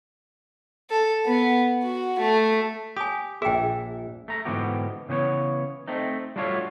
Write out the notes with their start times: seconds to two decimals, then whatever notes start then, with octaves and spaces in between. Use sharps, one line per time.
0.90 A4
1.26 B3
1.83 F#4
2.19 A3
2.97 G4 G#5 D#6
3.42 A#1 G#4 E5 G5
4.28 A3 A#5
4.45 G#2 D3 E3 B3 F#4 G4
5.09 C#3 E3 B3 C5 C#5
5.88 A3 C4 D#4
6.36 G3 A3 D4 F4 F#4 C#5